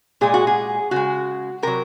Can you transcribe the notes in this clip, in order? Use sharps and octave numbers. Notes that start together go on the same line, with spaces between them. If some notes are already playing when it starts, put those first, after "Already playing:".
A#2 G#3 G#4
F#4
G#4
C#3 G#3 F#4
C3 F#3 A#4